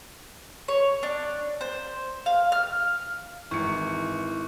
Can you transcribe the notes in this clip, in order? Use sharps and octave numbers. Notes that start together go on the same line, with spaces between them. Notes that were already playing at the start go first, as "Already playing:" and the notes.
C#5
D4
C5
F5
F6
G#1 E3 C#6 C#7